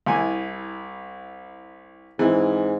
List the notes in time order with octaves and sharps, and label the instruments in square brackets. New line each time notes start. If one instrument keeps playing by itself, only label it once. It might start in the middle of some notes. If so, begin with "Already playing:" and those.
[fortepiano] C2 E4 G#5
[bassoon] G#2 [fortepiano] E3 C4